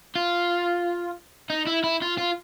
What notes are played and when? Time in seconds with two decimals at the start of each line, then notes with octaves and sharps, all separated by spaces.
0.16 F4
1.50 D#4
1.67 E4
1.84 E4
2.02 F4
2.18 F4